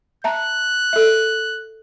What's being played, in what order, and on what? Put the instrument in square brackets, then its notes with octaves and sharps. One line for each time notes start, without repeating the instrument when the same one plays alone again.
[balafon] E5 A5 A#5 [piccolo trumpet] F#6
[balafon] A4 E5